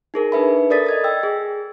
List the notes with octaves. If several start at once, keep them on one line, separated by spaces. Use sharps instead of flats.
D#4 G#4 A#4
D4 D#4 B4 E5 B5
A4 A#4 D5 D#6 A6 B6
D#5 G#6 A6
G5 E6
G#4